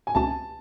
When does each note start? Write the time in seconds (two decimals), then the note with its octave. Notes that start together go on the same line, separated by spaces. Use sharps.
0.07 G#5
0.15 C#2 B2 A3 C#4 F#4 A5